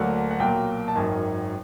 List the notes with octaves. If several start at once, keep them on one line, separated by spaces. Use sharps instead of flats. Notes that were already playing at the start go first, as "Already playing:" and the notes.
Already playing: D2 D3 F#3 A#3 F#5
F#5
B1 A#2 F#3 A#3 G5
A5
G#1 F#2 D#3 G#5